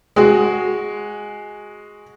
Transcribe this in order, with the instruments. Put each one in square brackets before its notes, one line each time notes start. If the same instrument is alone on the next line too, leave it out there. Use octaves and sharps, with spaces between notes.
[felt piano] G#3 F#4